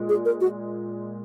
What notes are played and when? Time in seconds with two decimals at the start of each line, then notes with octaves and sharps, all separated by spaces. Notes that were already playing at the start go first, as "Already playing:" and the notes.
Already playing: A#2 G#3
0.09 G#4
0.25 A#4
0.41 F#4